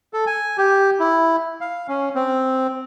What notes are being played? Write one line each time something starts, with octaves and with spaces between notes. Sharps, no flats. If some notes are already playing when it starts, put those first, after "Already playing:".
A4
G#5
G4
E4
F5
C#4
C4